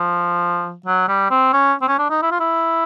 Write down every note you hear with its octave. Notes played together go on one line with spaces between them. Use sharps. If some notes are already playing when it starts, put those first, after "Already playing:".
Already playing: F3
F#3
G3
C4
C#4
C4
C#4
D4
D#4
E4
F4
E4